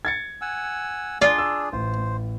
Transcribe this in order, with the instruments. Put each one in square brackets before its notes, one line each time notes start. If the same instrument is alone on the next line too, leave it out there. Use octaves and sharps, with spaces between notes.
[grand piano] G#6 A6 C#7
[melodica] F#5 G#5 E6
[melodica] D4 G#4 [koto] F4 [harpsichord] D5
[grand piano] E6
[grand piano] A1 [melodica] C5